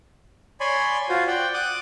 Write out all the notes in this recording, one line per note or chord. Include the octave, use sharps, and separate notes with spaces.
C#5 D5 G#5 B5 C6
F4 F#4 C5
D5 F#5 G5
F#5 D6 D#6 F#6